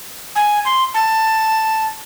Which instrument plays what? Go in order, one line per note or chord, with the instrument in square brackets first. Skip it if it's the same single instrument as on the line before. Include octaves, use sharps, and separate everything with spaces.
[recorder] G#5
C6
A5